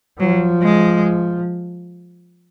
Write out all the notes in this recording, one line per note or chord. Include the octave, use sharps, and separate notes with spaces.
F3 F#3
G#3